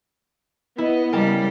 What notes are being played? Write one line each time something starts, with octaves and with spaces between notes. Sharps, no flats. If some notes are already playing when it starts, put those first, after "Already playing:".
B3 E4 D#5
C#3 G3 A#4 G5 A5